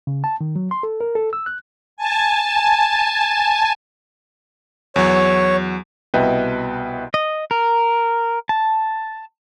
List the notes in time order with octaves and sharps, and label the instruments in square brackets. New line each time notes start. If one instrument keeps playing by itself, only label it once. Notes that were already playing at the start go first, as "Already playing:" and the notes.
[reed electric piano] C#3
A5
D#3
F#3
C6
A4
A#4
A4
E6
F#6
[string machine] G#5 A5
[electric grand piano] E2 F#3 [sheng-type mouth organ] C#5
[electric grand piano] C2 B2 B4 D#5 E5 G5
[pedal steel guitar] D#5
A#4
A5